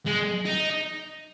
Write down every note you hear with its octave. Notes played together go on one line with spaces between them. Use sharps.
G#3
D#4